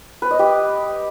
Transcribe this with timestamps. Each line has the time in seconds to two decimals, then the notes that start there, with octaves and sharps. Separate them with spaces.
0.22 B4
0.31 D#5
0.39 G4